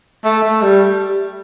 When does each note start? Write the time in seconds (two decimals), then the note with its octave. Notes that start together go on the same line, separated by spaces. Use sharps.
0.24 A3
0.43 A3
0.62 G3